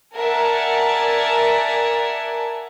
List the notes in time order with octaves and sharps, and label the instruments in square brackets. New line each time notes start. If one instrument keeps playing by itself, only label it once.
[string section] A#4 D5 E5 F#5 G#5 A5